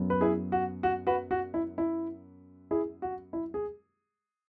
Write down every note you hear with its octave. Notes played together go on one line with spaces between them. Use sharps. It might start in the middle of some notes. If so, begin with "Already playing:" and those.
Already playing: F#2 F#3 B3
B4
E4 G#4
F#4
F#4
F#4 B4
F#4
E4
E4
E4 G#4
F#4
E4
G#4